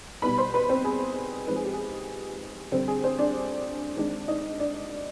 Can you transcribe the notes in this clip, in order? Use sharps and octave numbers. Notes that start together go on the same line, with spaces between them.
B2 G3 B3 D#4 B4 B5
C5 C6
B4 B5
C4 C5
G#4
F3 G#3 C4 D#4 B4
G#4
G4
G#4
D3 G3 C4 D4 C5
G#4
C4 C5
D4 D5
D#3 G#3 C4 D4 D5
D#4 D#5
D4 D5